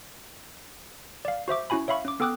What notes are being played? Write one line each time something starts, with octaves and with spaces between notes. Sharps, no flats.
D5 F5
F#4 C5 E5 D6
C#4 E4 F#4 G#5 B5
C#5 E5 F5 B5 C#6
C#4 D6
B3 A4 G5 D6 D#6 F#6